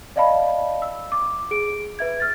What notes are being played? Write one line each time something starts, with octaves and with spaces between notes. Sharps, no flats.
D5 D#5 F5 A5 B5
E6
D6
G#4 D7
B4 E5 G#6
F6 A6